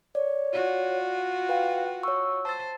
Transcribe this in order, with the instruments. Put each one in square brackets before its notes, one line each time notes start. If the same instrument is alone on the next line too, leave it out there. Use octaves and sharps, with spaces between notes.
[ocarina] C#5 [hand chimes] D5
[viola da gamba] F4 F#4
[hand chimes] B4 G5 [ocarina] F5
[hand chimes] C#5 C#6 [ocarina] E6
[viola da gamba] C5 [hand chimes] A5 A6